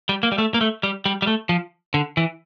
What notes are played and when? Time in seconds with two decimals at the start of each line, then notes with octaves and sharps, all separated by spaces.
0.09 G3
0.23 A#3
0.32 G3
0.38 A3
0.54 A#3
0.61 A3
0.83 G3
1.06 G3
1.22 G3
1.27 A3
1.49 F3
1.94 D3
2.17 E3